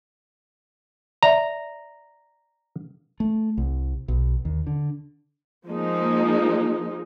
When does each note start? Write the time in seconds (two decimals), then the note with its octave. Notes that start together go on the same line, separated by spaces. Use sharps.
1.23 D5 E5 A#5
3.20 A3
3.57 C2
4.08 B1
4.45 D#2
4.67 D3
5.68 F3 G#3 A#3 D#4